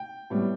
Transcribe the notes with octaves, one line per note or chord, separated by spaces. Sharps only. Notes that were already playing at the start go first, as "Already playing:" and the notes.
Already playing: G5
A2 G3 B3